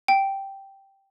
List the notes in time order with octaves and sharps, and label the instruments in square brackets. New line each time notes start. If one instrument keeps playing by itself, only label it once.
[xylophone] G5